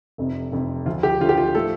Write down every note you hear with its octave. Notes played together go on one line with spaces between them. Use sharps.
F1 F2 C3
F1 F2 C3
D2 D3 F3 A3 F4
G4
D2 D3 F3 A3 F4
G4
F4
A2 F3 A3 A4